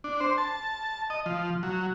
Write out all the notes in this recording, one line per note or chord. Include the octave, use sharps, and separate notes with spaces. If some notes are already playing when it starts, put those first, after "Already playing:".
D4
C5
A5
D#5
F3
F#3